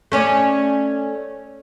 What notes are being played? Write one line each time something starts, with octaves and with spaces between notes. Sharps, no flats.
A3 C#4 D5